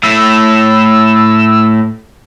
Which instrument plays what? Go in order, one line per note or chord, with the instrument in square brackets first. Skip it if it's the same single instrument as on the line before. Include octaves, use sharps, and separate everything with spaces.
[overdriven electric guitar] A2 A3 [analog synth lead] E6